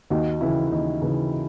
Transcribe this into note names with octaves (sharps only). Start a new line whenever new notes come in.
D#2 D#4 F#4
C#3 E3 E4
D#2 D#4
C#3 E3